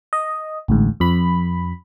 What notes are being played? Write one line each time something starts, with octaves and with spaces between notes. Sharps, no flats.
D#5
A1 D2 G#2
F2 B5